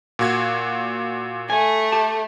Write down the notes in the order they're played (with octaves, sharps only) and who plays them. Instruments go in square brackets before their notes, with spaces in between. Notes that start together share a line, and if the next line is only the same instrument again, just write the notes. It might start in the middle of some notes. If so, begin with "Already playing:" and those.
[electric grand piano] A#2 F#4 G#6
[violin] A3 [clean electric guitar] G#5
[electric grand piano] G4 [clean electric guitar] A5